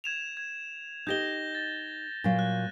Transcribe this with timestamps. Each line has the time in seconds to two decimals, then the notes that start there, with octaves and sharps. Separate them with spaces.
0.04 G#6 E7 F7
0.37 G#6
1.07 D#4 G4 D#5 G6 A#6 G7
1.55 A6
2.24 A#2 F#3 F5
2.39 F#6